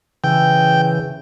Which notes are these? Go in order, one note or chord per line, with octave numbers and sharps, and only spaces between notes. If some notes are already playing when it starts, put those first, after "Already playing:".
C#3 E3 G5